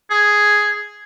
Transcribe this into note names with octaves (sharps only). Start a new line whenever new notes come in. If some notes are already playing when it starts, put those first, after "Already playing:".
G#4